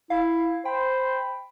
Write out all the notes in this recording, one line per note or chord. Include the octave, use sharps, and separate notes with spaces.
E4 F5
C5 G5 B5